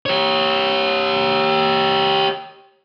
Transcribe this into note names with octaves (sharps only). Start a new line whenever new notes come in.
G4 C#5